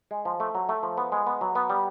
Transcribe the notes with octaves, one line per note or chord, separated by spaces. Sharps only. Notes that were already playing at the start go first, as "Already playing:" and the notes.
G#3
F3
A3
F#3
A3
F3
B3
G#3
B3
F#3
B3
G3